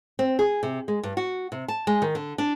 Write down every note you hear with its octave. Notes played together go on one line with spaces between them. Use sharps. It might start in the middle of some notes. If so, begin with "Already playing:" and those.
C4
G#4
C3
G#3
G2
F#4
C3
A5
G#3
D#3
D3
D4